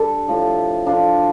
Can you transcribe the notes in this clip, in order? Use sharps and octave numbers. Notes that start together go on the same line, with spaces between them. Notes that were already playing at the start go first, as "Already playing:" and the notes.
Already playing: G3 D4 A4
A2 F3 A3
F3 D4 F4 A4